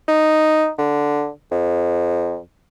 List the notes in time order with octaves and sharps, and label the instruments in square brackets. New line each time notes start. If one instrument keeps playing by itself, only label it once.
[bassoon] D#4
D3
F2